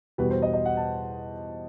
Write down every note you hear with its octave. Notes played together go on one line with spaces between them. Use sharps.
E2 B2 G3 B4
C5
D#5
D#5
F#5
A5